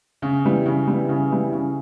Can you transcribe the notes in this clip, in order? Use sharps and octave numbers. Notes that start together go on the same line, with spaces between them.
C#3
E3 G3
C#3
E3 G3
C#3
E3 G3
C#3